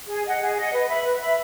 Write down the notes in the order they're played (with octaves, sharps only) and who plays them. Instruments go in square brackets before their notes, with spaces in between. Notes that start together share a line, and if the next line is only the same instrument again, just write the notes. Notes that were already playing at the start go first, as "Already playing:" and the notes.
[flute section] G#4
D#5 F#5
G#4
D#5 F#5
B4
E5 B5
B4
E5 B5